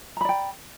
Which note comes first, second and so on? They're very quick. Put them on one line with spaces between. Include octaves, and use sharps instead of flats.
A#5 B5 D5 G5